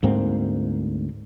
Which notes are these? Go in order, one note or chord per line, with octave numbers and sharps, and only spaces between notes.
D2 G#2 A#3 C4